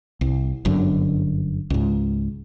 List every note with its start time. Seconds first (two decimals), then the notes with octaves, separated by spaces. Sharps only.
0.21 C2
0.65 G1 F#2 D3
1.70 C#2 G#2